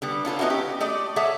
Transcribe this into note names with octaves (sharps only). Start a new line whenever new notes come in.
D3 G3 B3
C#4 F4 A4 B4
B3 C#4 D#4 E4 F#4
G4
A3 D5 D#5
G#4 A4 C#5 E5 F#5